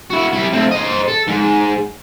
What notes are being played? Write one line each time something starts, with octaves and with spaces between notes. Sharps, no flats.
E4 F#4
G3 E4
A3 C4
C5 D#5
A4
G#2